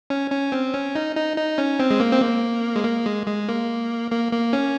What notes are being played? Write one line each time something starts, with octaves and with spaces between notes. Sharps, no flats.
C#4
C#4
C4
C#4
D#4
D#4
D#4
C#4
C4
G#3
A#3
C4
A#3
G#3
A#3
G#3
G#3
A#3
A#3
A#3
C#4